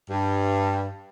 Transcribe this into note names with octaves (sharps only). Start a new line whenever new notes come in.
G2